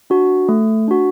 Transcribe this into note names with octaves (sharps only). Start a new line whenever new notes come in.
D4 F#4
A3
D4 F#4